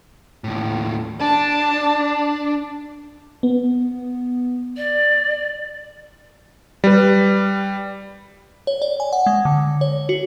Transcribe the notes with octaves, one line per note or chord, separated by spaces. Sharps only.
D#2 A2
D4 A5
B3
D5
G3 B4
C#5
D5
G#5
F#5
G#3
D3
C#5
F#4